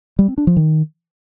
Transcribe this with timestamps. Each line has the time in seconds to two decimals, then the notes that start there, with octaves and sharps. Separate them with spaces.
0.19 G3
0.28 C4
0.38 D4
0.47 F3
0.57 D#3